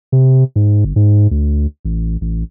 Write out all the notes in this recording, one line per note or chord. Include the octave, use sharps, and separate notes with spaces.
C3
G#2
G1
G#2
D2
A1
A1